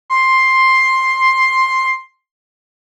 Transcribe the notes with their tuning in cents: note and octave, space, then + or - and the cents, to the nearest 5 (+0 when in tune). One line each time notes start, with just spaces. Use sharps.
C6 +10